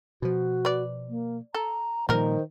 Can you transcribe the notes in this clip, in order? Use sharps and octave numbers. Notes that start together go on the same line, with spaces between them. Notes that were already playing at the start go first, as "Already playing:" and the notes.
B2 F3 F#4
B4 D5
A#3
A4 A#5
A#2 D#3 F3 G3 D#4 A#4 C5